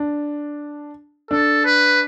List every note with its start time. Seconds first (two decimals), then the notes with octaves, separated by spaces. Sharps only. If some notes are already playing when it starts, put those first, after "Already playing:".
Already playing: D4
1.31 D4 A4
1.65 B4